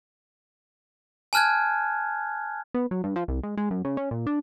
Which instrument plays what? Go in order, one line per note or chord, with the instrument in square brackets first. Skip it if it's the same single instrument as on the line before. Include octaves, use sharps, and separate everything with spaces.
[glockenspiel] G#5 A5 F6 F#6 G#6
[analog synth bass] B3
F#3
G2
F3
C2
G#3
G#3
F#2
C#3
C#4
A#2
D4